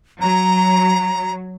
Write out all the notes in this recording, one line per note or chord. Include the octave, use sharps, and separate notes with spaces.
F#3 A#5